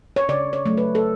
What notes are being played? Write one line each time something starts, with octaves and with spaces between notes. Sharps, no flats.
C#5
C#3 D5
C#5
F#3 A3
B4
A4